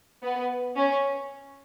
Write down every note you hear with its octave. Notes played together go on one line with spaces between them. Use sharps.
B3
C#4